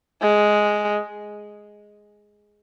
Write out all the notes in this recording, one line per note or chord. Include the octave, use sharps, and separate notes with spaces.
G#3